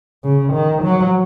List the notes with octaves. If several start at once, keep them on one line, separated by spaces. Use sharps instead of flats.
C#3
D#3
F#3